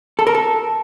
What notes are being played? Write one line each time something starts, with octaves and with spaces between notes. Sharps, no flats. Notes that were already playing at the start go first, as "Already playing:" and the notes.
A4
A#4
A4